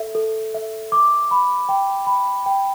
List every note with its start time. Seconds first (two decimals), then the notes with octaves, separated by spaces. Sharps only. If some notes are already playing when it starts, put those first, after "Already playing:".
Already playing: A4 E5
0.15 A4
0.54 E5
0.92 D6
1.31 B5
1.69 G5
2.07 B5
2.46 G5